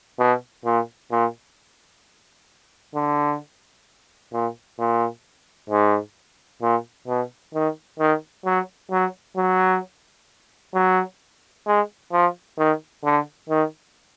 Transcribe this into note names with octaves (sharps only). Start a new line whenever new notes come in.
B2
A#2
A#2
D3
A#2
A#2
G#2
A#2
B2
D#3
D#3
F#3
F#3
F#3
F#3
G#3
F3
D#3
D3
D#3